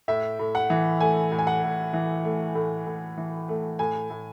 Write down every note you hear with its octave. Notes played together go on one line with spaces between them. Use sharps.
A2 E5
A2
F#5
E3
A3 G#5
A2
G#5
F#5
A2
E3
A3
A2
A2
E3
A3
A2 G#5
A2